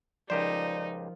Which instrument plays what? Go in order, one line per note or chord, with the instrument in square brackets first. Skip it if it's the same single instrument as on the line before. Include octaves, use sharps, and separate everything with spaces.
[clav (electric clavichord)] C#2 G4 C5 [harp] F3 A#4 [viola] D#4 [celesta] D5